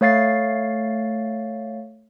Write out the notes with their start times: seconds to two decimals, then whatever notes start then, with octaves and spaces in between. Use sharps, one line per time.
0.01 A3 C#5 F5 A6 C7